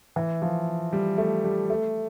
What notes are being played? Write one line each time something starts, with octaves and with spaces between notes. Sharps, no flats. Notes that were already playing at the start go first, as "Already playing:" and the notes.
E3
F3
G3
A3
G3
A3